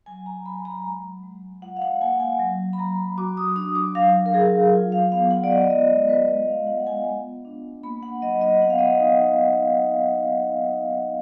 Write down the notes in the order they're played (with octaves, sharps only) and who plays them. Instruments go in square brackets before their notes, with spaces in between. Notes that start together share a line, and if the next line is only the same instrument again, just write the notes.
[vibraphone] F#3 G#5
A#5
F#3 B5
A#5
G#3
G#3
F4 F#5
F5
F#5
A#3 G#5
G#5
F#3
B5
F#3 A#5
F#4 D6
D#6
D4 D#6
D6
F#3 F5
A#4
F#3 G#4
F4
F5
B3 F5
F#5
D5
G#3 D#5
D#5
G#3
B4
F4 D#5
F5
B3 F#5
G#5
B3
D4
A#3 B5
F#5
F#3 D#5
D#5
B3 F#5
F5
D#5
F5
D#4